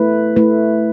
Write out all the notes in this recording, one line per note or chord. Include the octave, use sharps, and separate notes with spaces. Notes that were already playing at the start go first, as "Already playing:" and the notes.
Already playing: A3 E4 B4
A3 E4 B4